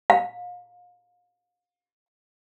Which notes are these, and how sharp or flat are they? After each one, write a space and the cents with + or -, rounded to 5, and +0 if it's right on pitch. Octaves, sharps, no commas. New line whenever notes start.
F5 +35